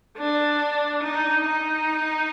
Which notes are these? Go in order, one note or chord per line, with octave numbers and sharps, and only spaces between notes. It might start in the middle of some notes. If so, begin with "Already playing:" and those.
D4
D#4
D#4